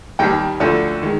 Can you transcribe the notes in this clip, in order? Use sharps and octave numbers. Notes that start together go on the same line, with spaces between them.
D#2 D#3 G3 G5
D2 D3 F3
D#3 G#3